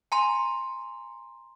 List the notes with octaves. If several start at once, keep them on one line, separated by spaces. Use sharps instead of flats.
G#5 A#5 C6